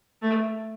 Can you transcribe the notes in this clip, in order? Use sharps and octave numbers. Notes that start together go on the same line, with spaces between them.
A3